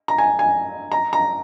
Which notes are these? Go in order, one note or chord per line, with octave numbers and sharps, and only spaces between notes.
A#5
G#5
G#5
A#5
A#5